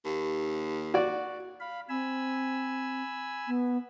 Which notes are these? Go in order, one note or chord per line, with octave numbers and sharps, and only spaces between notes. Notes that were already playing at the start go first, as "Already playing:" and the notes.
D#2
F#4 D5
F5 B5
C4 G#5 B5 E6
B3